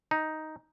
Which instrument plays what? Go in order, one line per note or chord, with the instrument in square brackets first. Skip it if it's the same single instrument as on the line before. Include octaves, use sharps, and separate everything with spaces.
[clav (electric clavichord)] D#4